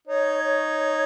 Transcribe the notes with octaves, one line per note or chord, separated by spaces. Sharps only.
D#4 C#5
C#5